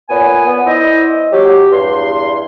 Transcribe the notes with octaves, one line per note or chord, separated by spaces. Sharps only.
A#2 B3 C#5 G#5
B3
E4 C5 D5 D#5
F#3 G4
E2 G2 C6